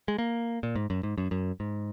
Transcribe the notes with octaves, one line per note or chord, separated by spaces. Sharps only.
G#3
A#3
A#2
G#2
F#2
G#2
F#2
F#2
G#2